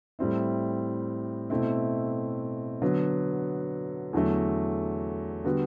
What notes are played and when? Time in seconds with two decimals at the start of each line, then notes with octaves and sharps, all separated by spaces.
0.19 A2 G3 C4 E4
1.50 B2 A3 C4 E4
2.82 D3 F#3 B3
4.13 E2 D3 F#3 A3
5.45 D3 G3 B3 F#4